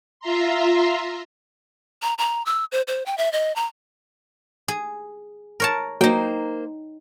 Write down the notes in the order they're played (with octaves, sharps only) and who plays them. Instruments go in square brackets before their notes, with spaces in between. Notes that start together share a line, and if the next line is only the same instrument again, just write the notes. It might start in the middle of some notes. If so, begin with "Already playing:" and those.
[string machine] F4 E5 A#5 C6
[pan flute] A#5
A#5
E6
C5
C5
G5
E5
D#5
A#5
[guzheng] G#4
A#4 C#5 A5
[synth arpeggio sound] F#3 [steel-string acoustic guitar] A#3 C5 [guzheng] D#4 G5